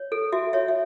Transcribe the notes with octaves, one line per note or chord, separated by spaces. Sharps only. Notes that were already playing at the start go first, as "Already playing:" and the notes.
Already playing: C#5
A4
F#4 E5
C#5 E5
E5